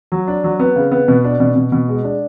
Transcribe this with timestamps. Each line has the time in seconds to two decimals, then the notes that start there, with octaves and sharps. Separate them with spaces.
0.12 F#3
0.27 D4
0.44 F#3
0.59 B3
0.76 C#3
0.91 B3
1.08 B2
1.24 D4
1.40 B2
1.56 B2
1.72 B2
1.88 G#3
2.04 D4